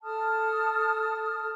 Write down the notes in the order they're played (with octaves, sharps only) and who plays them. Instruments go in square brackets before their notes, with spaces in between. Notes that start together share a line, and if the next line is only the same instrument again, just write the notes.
[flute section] A4 A5 D#6 F6